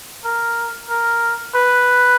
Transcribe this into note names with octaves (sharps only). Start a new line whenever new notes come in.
A#4
A#4
B4